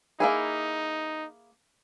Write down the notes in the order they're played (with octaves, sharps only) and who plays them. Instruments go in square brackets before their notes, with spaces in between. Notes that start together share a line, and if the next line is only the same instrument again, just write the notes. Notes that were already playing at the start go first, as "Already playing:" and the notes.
[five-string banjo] A#3 E4 G#4 [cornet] D#4